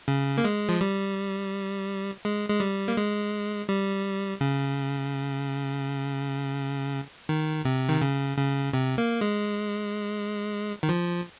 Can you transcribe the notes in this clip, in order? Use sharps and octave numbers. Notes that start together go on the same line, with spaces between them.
C#3
A#3
G#3
F3
G3
G#3
G#3
G3
A#3
G#3
G3
C#3
D#3
C3
D#3
C#3
C#3
C3
A#3
G#3
D#3
F3